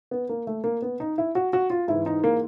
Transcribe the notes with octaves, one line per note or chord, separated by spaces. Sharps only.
B3
A#3
A3
A#3
B3
D#4
E4
F#4
F#4
F4
G#2 E3 E4
D#4
A#3